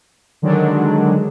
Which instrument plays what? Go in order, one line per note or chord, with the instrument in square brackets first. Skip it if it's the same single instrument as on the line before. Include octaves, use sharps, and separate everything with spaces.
[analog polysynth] D3 D#3 F#3 G#3 D4